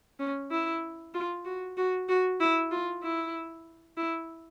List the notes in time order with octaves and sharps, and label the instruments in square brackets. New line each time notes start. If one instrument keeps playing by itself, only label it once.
[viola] C#4
E4
F4
F#4
F#4
F#4
E4
F4
E4
E4